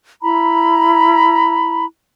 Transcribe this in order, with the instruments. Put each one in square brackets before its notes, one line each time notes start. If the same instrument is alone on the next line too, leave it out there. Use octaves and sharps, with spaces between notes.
[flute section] E4 A#5 B5